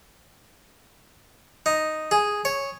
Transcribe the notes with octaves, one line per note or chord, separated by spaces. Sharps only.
D#4
G#4
C#5